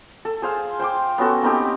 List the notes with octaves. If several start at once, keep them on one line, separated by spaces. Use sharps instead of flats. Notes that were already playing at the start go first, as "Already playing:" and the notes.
A4
G#4 C5 F5
C5 G5 C6 D6
B3 C#4 F#4 A4
A#3 C4 D#4 G4